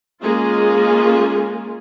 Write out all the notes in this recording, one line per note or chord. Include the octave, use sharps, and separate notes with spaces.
G#3 A#3 C#4 F4 G#4